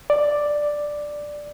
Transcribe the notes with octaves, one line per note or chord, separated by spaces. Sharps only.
D5